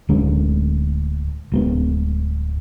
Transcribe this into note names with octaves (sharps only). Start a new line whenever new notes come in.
D1 D2 G#3 C#4
D1 G#3 B3